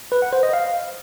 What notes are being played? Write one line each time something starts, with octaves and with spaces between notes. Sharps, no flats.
B4
F#5
C5
D#5
F5